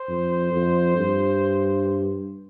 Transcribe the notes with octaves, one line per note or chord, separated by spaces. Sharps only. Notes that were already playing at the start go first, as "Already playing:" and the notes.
Already playing: C5
F2
F2
G2